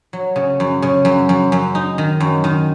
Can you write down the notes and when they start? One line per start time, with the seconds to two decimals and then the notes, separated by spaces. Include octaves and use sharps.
0.13 F#3
0.36 C#3
0.60 F#2
0.82 C#3
1.05 F#2
1.29 F#2
1.52 F#2
1.75 D#4
1.98 D#3
2.20 F#2
2.44 D#3